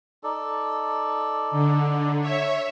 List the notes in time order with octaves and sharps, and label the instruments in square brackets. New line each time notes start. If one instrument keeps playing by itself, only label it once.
[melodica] D#4 A4 D5
[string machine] D3
C#5 E5